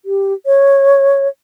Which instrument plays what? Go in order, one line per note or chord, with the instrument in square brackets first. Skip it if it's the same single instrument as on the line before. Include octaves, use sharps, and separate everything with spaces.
[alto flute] G4
C#5